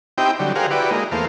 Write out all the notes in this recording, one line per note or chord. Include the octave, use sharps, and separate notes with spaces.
C4 D#4 E4 G4 G5
D3 F#3 G3
G4 G#4 A#4 C5 F5 F#5
E4 F#4 G4 B4 D5
G#3 A#3 D#4
E2 A3 A#3 C5 F5